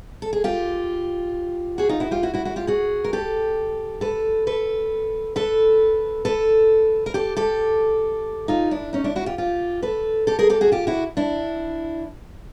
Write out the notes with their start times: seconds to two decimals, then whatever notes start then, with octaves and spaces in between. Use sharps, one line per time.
0.22 A4
0.33 G#4
0.44 F4 G4
1.78 F#4 G#4
1.89 D#4 F4
2.00 E4 F#4
2.11 F4 G4
2.23 E4 F#4
2.34 E4 F#4
2.45 E4 F#4
2.56 F4 G4
2.67 F#4 G#4
3.04 A#4
3.13 G4 A4
4.01 A4 B4
4.47 A4 B4
5.36 A4 B4
6.25 A4 B4
7.06 A#4
7.14 G4 A4
7.37 G4 A4
8.48 D#4 F4
8.71 D4 E4
8.93 C#4 D#4
9.04 D4 E4
9.16 E4 F#4
9.26 F4 G4
9.38 F4 G4
9.83 A4 B4
10.27 G4 A4
10.39 G#4 A#4
10.50 G4 A4
10.61 F#4 G#4
10.72 F4 G4
10.87 E4 F#4
11.17 D4 E4